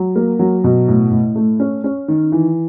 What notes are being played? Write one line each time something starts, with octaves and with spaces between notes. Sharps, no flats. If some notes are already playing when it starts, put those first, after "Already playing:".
Already playing: F#3
A#3
F#3
B2
A2
A2
A3
C#4
C#4
D#3
E3